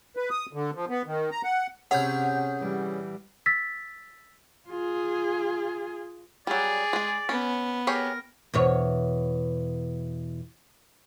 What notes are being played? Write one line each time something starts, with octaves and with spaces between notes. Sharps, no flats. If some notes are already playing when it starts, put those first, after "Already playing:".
B4
D#6
D3
F3
B3
D#3
A#5
F#5
C3 C#4 G#4 F#5 B5 G6
E3 G3
E6 A6 B6
F4 G#4
F#3 G3 G#4 D5
G#3 G#5
B3 C#4
G4 G#4 A#4 C#5
E2 B2 C#5